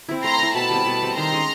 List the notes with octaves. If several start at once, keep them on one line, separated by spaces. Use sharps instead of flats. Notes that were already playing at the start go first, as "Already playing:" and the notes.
C4 E4
A3 A#5 C6
C4 E4
B2 A5 B5
G3 C4
B2
G3 C4
D#3 A#5 C6
G#3 C#4